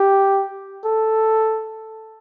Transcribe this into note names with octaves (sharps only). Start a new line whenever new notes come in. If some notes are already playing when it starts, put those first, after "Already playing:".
Already playing: G4
A4